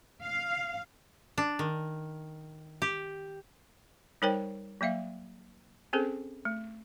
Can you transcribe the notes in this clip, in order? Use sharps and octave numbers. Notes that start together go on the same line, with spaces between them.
F5
D4
D#3
G4
G3 D#4 A#4 C5 C#5 G5
F#3 A#3 E5 F5
C4 C#4 G#4 A4 C5
A3